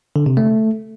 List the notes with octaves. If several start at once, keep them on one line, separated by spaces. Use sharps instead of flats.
D3
C3
A3